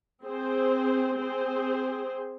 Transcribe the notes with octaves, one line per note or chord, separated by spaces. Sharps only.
C4 G#4 C5
C4 G#4 C5